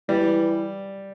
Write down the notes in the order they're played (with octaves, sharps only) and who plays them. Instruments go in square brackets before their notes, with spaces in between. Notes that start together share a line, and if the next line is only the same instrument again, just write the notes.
[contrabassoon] E3 [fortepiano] G3